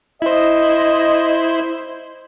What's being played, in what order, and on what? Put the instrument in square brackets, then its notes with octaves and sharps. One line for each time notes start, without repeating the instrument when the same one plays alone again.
[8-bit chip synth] E4 C5 [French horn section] D#5